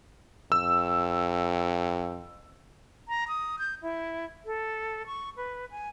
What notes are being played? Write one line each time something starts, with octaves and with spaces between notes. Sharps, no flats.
F2 E6
A#5
D#6
G6
E4
A4
C#6
B4
G#5